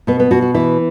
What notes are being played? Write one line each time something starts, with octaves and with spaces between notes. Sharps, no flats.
B2 B3
B3
B2 F#4
F#4
E3 E4